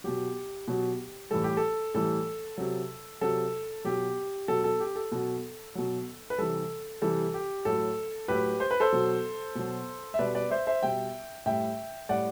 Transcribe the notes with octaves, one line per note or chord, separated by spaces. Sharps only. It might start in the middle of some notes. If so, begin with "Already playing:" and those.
B2 F#3 G4
B2 F#3
A2 E3 G3 A4
G4
A4
A2 E3 G3 A4
C3 F#3
C3 F#3 A4
B2 F#3 G4
B2 F#3 A4
A4
G4
A4
B2 F#3
B2 F#3
B4
C3 E3 G3 A4
C3 E3 G3 A4
G4
A2 F#3 A4
A2 F#3 G4 B4
C5
B4
A4 C5
B2 F#3
B2 F#3
E5
B2 G3 B4 D5
B4 D5
C5 E5
C5 E5
B2 G3 E5 G5
A2 G3 E5 G5
A2 G3 D5 F#5